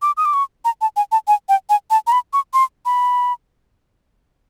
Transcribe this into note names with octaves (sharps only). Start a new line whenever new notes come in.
D6
D#6
D6
C#6
A#5
A5
G#5
A5
G#5
G5
G#5
A5
A#5
B5
C#6
C6
B5